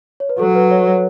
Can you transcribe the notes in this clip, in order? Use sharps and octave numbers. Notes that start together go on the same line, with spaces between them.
C#5
B4
F#3 A4
B4
C#5
C#5